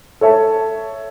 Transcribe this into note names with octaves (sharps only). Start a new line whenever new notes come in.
A4 C#5 E5 A5